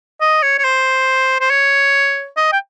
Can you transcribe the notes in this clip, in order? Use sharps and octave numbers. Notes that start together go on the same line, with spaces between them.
D#5
C#5
C#5
C5
C5
C#5
D#5
G5